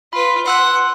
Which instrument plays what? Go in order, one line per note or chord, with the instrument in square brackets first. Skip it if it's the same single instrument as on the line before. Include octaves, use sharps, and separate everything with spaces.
[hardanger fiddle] F4 B4 [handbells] B5
[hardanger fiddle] F#5 [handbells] C6 E6 F#6